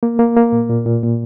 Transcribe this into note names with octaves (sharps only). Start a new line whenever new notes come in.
A#3
A#3
A#3
A#2
A#2
A#2
A#2